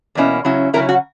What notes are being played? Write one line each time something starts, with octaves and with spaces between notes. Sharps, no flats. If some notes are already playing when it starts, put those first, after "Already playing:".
E2 B2 A#3 C#4 E4
C#3 F#3 C#4 E4
C#3 F#3 C#4 E4 A#4
F#4